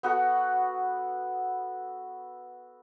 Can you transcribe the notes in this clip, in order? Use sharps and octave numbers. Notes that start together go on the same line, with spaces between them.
B3 F#4 A4 F#5